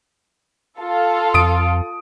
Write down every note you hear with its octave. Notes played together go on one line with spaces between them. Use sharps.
F4 A4
F2 D#6 D7